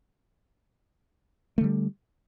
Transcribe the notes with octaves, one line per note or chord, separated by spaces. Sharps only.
D3 G3 A3